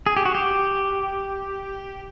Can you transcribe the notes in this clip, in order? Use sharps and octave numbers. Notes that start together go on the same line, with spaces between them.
G#4
G4
F#4
G4